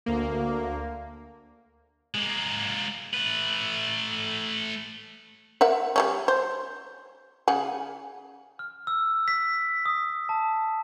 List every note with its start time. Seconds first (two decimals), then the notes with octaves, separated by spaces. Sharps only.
0.06 D2 A#3
2.15 G#3 A#3
3.14 A3 B4
5.61 A#4 E5 F#5
5.96 G3 A3 C#4
6.28 C5
7.48 C#3 F#5 G#5
8.59 F6
8.87 E6
9.28 B6
9.86 D#6
10.29 A5